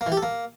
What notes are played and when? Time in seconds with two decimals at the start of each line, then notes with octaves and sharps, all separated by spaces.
0.01 A#3
0.06 E3
0.12 G4
0.17 A4
0.23 A#3